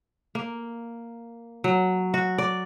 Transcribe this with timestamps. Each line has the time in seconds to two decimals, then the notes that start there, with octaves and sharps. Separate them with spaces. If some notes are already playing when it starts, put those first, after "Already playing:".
0.35 A#3
1.64 F#3
2.14 F#4
2.38 D5